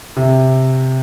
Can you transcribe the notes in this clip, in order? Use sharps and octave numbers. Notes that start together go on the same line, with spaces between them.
C3